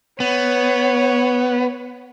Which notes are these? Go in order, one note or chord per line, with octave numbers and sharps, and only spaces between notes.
B3 C#5